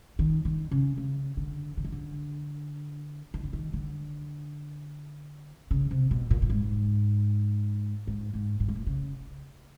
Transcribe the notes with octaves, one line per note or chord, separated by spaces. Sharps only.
D#3
D#3
C#3
C#3
D3
D3
D#3
D3
D#3
D3
D#3
D3
C#3
C3
B2
A#2
A2
G#2
G#2
G#2
A2
G#2
A2
C#3